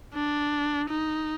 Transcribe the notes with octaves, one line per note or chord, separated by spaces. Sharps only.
D4
D#4